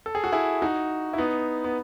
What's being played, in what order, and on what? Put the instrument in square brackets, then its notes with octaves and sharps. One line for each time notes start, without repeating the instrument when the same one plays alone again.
[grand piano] A4
G#4
F#4
E4 G#4
D#4 F#4
E4
B3 D#4
B3